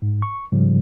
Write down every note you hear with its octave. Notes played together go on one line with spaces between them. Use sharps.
G#2
C#6
G#2 C#3 F3 G3